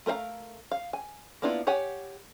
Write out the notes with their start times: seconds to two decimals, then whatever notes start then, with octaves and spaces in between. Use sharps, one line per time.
0.06 A3 A#4 C5 F5 A#5
0.71 F5
0.93 G#5
1.42 A#3 B3 D4 E4 F4
1.67 G4 C#5 F#5 G#5